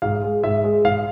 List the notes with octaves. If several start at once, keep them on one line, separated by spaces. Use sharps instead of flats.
G#2 F5
G#3
G#2 E5
G#3
G#2 F5